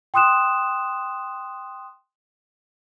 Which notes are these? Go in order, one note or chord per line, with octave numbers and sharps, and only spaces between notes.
G5 C6 D#6 F#6 E7